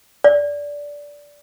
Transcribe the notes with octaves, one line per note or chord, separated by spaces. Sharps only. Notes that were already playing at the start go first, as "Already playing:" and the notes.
D5